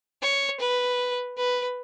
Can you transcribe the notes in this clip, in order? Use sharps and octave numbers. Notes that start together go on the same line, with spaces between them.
C#5
B4
B4